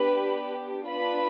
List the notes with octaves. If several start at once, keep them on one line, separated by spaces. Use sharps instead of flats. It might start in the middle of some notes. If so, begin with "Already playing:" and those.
Already playing: B3 D4 G4 B4 B5
B3 D4 F4 B4 B5